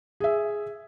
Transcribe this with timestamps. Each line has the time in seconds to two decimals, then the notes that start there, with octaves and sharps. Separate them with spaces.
0.20 G#4 E5